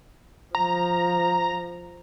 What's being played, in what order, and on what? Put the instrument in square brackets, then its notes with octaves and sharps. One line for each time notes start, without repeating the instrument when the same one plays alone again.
[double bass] F3 [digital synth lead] A#5